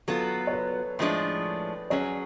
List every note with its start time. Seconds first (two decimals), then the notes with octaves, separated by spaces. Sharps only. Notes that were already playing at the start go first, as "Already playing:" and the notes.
0.08 F#3 B3 F4 A4
0.47 C#5
0.53 B4
0.99 A2 F3 G#3 D4
1.90 F#3 C#4 G#4 C#5